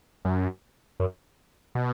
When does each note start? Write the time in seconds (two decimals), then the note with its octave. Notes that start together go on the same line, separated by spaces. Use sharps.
0.25 F#2
1.00 F#2
1.75 B2